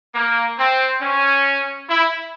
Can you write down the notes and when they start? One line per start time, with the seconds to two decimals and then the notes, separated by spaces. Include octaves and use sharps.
0.15 A#3
0.58 C4
1.01 C#4
1.88 E4